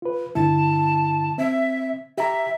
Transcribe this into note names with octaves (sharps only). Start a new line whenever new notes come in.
F4 B4
G2 D3 E4 A5
C4 E5
G4 E5 A#5